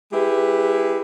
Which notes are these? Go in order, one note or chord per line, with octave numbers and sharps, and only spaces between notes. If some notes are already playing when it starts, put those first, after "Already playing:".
G#3 E4 G4 B4